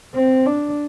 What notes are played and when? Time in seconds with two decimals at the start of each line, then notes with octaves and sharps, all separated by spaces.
0.15 C4
0.46 D4